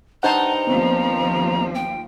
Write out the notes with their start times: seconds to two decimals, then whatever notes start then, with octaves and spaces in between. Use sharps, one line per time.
0.23 G2 D#4 C5 F#5 A5 A#5
0.67 D#2 F3 B3 C4
1.75 G5